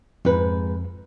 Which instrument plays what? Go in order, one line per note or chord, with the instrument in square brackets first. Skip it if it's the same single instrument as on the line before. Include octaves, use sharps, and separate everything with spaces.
[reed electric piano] F2 [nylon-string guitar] G#2 B4